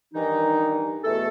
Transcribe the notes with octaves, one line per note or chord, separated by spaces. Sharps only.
G2 D#3 E3 D#4
E2 B2 A3 A4